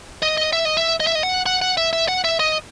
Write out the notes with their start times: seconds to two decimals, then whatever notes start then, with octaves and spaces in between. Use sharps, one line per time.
0.22 D#5
0.38 D#5
0.53 E5
0.65 D#5
0.77 E5
1.00 D#5
1.07 E5
1.15 D#5
1.23 F#5
1.46 F#5
1.62 F#5
1.77 E5
1.93 E5
2.08 F#5
2.24 E5
2.40 D#5